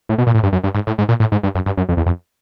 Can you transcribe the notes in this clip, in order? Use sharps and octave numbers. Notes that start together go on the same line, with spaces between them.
A2
B2
A#2
A2
G2
F#2
G2
G#2
A2
G#2
A#2
A2
G#2
G2
F#2
G2
F#2
F2
E2
F2